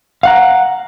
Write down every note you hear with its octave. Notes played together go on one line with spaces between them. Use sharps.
F5 F#5 A#5